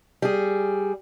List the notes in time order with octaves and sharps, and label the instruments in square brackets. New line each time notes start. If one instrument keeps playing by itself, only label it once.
[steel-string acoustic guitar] G3 G#4